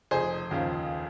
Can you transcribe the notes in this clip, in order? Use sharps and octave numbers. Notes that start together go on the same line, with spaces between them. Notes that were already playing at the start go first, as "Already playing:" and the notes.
F1 G#4 C5
D#2 C#3 F3